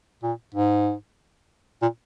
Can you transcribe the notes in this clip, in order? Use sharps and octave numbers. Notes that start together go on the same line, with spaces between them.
A#2
G#2
A#2